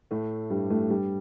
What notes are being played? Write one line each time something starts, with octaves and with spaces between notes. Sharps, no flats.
A2 A3
G2 G3
A2 A3
G2 G3